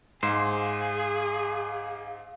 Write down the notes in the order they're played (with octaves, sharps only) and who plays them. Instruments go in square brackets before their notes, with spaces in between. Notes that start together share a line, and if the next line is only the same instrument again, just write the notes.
[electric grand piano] G#2 [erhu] G#4 [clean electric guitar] C5 [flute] F5